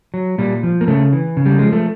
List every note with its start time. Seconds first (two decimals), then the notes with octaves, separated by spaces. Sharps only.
0.14 F#3
0.38 A#2 G3
0.63 F3
0.81 A#3
0.88 C#3 A3
1.13 E3
1.37 C#3
1.46 G3
1.59 F3 G#3
1.73 A3